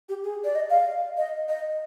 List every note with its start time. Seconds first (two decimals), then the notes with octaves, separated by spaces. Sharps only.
0.09 G4
0.24 G#4
0.44 D5
0.55 D#5
0.70 F5
1.17 D#5
1.49 D#5